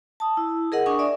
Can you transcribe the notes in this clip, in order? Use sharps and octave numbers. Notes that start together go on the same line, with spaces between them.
A5 D#6
E4
G#4 A#4 D#5 F#5
D4 G#5 C#6 D#6
D5 E5